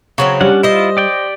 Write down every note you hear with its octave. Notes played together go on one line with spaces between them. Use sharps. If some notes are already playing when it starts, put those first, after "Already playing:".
C#3 F#3 C4
G3 C#4 D4 F#5
E4 F4 C5 D#5
G4 D5 G5